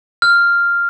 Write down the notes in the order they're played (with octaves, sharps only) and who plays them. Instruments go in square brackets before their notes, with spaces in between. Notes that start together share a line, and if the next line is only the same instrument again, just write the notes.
[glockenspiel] F6